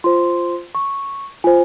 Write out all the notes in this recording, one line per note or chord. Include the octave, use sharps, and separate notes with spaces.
F4 C5 C6
C#6
F4 C5 G#5